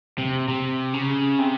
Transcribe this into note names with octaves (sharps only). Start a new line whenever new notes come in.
C3
C3
C#3
C3